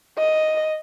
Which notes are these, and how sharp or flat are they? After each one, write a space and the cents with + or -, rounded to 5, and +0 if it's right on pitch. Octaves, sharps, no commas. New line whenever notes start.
D#5 +5